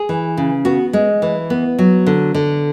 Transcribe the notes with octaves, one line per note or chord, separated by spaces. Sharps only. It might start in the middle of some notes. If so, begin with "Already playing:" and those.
Already playing: G#4
E3
C#3
B3 F#4
G#3
E3
B3
F#3
D3
D3